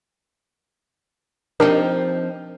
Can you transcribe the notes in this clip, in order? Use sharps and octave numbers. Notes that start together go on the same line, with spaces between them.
F3 C4 D4 D#4 G4 A#4